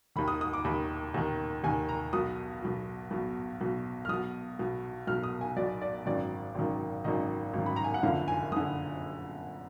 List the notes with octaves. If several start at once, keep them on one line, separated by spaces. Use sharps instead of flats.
D#2 D#3 B5
D#6
D#6
D6
D#2 D#3 B5
D#2 D#3
D#2 D#3 G#5
A#5
B1 B2 D#6
B1 B2
B1 B2
B1 B2
F6
B1 B2 D#6
B1 B2
B1 B2 F6
D#6
G#5
B1 B2 D5
D5
G#1 F#2 D#3 D5
G#1 F#2 D#3
G#1 F#2 D#3 D#5
G#1 F#2 D#3
B5
A#5
G#5
F#5
F#1 F2 D3 F5
G#5
F#1 D3 D#6